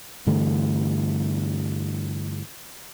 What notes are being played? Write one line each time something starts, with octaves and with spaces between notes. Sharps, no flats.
G2 D3 E3 A3